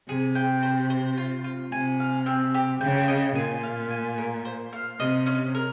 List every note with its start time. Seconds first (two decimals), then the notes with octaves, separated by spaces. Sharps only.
0.09 C3 G#4
0.35 G5
0.63 C5
0.90 C5
1.17 F4
1.44 F4
1.72 C3 G#5
2.00 F5
2.26 C4
2.55 G4
2.81 C#3 G5
3.08 D#5
3.35 A#2 G#5
3.63 F5
3.90 G#5
4.18 A#4
4.45 C5
4.73 F5
4.99 C3 D#5
5.26 C#4
5.55 A#4